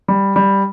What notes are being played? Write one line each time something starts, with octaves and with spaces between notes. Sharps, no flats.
G3
G3